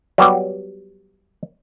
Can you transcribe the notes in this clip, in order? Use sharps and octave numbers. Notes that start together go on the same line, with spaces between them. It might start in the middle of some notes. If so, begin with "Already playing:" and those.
F#3 G3 B3 G4